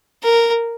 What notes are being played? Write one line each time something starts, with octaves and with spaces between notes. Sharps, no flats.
A#4